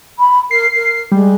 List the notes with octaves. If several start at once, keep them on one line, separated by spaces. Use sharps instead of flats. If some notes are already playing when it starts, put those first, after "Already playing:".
B5
A#4 C7
A#4
G3 G#3